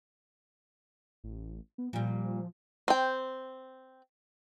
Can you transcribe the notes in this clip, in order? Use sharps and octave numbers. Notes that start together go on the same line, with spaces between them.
A1
B3
A#2 F3 G3
C4 G5